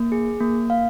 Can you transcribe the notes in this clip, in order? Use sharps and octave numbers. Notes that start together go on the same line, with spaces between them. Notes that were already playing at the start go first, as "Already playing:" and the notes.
Already playing: A#3
G#4
A#3
F5